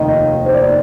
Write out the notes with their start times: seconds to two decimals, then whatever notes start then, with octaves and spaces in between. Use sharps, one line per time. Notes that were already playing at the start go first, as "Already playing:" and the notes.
Already playing: F1 D#2 D#3 D#5
0.46 C5
0.55 D5